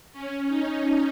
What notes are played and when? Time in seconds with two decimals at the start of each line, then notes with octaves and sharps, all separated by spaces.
0.13 C#4
0.48 D#4